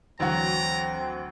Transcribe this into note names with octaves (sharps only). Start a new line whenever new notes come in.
D2 E3 F#3 C4 F#4 A#5